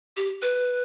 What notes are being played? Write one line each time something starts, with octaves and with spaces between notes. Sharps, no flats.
G4
B4